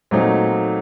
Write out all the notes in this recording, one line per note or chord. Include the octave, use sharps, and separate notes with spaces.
A#2 F#3 A3 C4 D#4